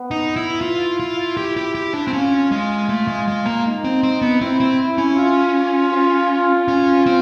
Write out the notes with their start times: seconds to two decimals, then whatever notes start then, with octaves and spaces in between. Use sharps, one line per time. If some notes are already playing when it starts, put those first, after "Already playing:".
Already playing: B3
0.11 D#4
0.36 E4
0.61 E4 F4
1.00 F4
1.37 G4
1.57 G4
1.75 G4
1.94 D4
2.07 C4
2.13 C#4 F4
2.51 G#3
2.89 A3
3.08 G#3
3.28 G#3
3.46 A#3
3.65 D#4
3.84 C4
4.03 C4
4.22 B3
4.41 C4 E4
4.60 C4
4.98 C#4
5.16 F4
5.92 F4
6.68 C#4
7.06 C4